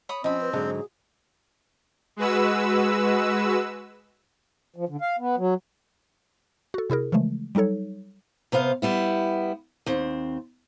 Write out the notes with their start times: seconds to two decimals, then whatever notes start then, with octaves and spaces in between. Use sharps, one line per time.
0.09 C#5 B5 D#6
0.24 F3 C4 C#4 D#5 B5
0.41 B4
0.53 G#2 D3 F#3 G#4
2.16 G#3 F#4 B4 E6
4.76 F3
4.89 D3
5.01 F5
5.19 B3
5.37 F#3
6.74 F#4 A4
6.90 C3 E4 G#4 A#4
7.12 C#3 E3 F3 G#3 A3
7.55 F#3 G3 D#4 A4 C#5
8.52 C3 B3 C5 F5
8.82 G3 B3 E4
9.86 D#2 C4